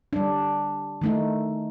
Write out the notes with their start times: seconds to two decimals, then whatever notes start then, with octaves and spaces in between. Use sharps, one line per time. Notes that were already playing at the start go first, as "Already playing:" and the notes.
0.13 G3 D4
1.02 D#3 A3 D#4